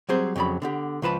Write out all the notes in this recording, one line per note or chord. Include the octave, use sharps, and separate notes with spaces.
F#3 G3 C4 G#4 C5
F2 C#3 F#3 D5 B5
D3 B3 G4
C#2 F3 B4 A5 B5